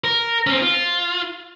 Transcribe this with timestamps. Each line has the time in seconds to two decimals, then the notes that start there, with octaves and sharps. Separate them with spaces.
0.04 A#4
0.47 C4 C#4
0.62 F4